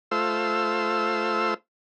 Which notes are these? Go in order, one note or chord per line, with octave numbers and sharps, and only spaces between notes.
A3 F4 C5 E6